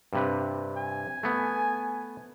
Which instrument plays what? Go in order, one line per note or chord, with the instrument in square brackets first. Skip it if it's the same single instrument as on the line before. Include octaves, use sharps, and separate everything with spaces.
[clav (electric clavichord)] G2 C3 B4
[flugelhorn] G#5
[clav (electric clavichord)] A3 B3